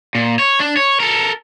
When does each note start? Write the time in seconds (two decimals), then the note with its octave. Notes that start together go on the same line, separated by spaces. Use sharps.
0.15 A#2
0.39 C#5
0.60 D4
0.77 C#5
1.00 A4 A#4